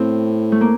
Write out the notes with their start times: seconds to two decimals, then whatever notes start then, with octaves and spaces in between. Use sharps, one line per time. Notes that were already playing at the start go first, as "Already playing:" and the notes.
Already playing: A2 C4
0.52 A3
0.61 A#3